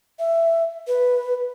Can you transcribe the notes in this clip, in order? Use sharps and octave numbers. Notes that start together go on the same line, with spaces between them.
E5
B4